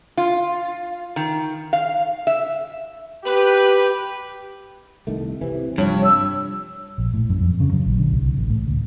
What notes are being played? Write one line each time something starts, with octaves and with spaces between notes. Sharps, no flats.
F4
D#3
F5
E5
G4 B4
C2 D#3 A3
C3 E3
F1 G2 C3 F3 C#5
E6
A#1
A2
F#2
F2
C#3
F#3
A#1
D3
C2
A1
A2
D2